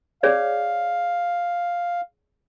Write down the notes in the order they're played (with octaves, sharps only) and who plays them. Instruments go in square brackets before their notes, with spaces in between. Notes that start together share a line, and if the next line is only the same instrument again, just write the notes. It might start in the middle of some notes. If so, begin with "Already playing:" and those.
[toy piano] G#4 C#5 D5 [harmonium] F5